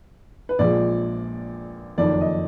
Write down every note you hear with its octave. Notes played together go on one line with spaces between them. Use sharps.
B4
A#1 A#2 F3 G#3 D5
F#1 F2 D#3 D5
D#5